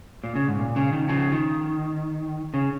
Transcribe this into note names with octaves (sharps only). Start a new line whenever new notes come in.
A#2
C#3
G#2
A#2
C#3
D#3
C#3 F3
D#3
C#3